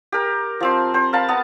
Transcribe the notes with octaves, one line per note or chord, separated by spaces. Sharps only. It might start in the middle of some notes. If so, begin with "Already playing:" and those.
G4 A#4
F3 C4 C6
C4 C5
A#4 F5 A5 B5
B3 A5